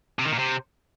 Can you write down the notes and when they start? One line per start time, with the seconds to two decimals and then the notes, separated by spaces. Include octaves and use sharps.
0.19 C3
0.25 D#3
0.32 A#2
0.39 C3